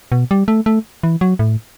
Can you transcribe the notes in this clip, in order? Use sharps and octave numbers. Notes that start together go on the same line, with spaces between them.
B2
G3
A3
A3
E3
F#3
A2